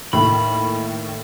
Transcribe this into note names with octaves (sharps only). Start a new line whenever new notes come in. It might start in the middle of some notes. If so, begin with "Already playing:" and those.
D#2 A2 B5